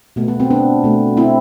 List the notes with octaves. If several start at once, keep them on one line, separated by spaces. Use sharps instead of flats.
B2 A3 B3
B3
C4
B3 D4
B2 A3
C4 E4